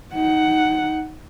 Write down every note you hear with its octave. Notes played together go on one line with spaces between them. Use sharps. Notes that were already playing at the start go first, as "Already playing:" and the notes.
D#4 F#5